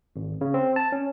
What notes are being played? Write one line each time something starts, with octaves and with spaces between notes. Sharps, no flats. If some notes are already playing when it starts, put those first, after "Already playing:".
G#1
C#3
C4
A5
C#4